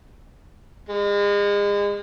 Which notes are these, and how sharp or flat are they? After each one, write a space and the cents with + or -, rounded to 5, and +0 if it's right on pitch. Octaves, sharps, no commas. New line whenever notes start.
G#3 -35